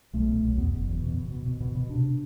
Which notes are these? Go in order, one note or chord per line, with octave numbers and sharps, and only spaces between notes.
B1 A3
B2
B1
E2 B3
F#1
E2
B2
B2
B2
B2
B2
B2
C3 D4